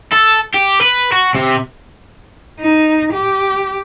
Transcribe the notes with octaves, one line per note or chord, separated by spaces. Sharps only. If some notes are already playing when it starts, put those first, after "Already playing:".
A4
G4
B4
F#4
C3
D#4
G4